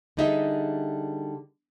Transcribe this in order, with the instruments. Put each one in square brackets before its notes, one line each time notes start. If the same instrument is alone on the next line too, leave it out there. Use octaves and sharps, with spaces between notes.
[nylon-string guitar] D3 G3 D#4 G#4 E5